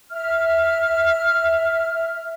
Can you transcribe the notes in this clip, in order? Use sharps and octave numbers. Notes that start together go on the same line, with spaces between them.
E5 F6